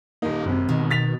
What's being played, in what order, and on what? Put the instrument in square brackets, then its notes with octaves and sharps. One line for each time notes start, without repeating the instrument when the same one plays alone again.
[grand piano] D#1 D#4 [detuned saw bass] A#3
[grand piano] G#1 C3 [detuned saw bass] F#2
[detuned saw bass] B2 [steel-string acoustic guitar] D#3
[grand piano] A6 B6 F7